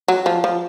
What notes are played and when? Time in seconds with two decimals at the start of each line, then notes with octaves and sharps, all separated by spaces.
0.08 F#3
0.26 F3
0.44 F3